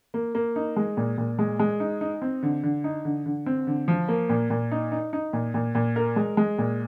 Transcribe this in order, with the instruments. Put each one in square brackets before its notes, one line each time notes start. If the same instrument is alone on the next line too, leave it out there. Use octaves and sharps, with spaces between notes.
[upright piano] A#3
A#3
D#4
G#3
A#2
A#2
G#3
G#3
D#4
D#4
C4
D3
D3
D#4
D3
D3
C4
D3
F3
A#3
A#2
A#2
D#4
D#4
D#4
A#2
A#2
A#2
A#4
G#3
G#3
A#2